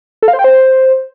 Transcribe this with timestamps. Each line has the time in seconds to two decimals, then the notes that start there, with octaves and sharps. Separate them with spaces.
0.22 A4
0.28 F5
0.33 C5
0.39 G5
0.44 C5